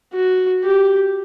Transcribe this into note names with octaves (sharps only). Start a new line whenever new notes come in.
F#4
G4